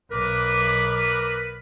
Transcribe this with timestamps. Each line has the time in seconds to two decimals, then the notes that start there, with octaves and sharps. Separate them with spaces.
0.11 B1 B3 A#4 B4 D6